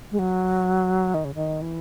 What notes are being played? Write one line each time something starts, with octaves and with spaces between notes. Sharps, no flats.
G#3
F#3
D#3
C#3
D#3
E3